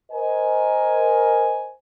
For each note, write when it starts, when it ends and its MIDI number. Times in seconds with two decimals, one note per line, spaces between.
0.11 1.73 70
0.11 1.73 72
0.11 1.73 75
0.11 1.73 80